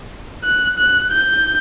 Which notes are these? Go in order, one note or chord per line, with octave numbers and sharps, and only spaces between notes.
F#6
F#6
G6